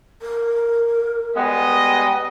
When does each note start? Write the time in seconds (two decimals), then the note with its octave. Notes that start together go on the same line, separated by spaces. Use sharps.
0.22 A#4
1.36 G3 G#3 B3 D#5